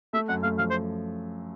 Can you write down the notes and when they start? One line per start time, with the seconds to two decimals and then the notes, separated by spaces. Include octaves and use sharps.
0.13 A3 E5
0.29 F#2 F#5
0.43 A3 F5
0.58 F3 F5
0.71 C5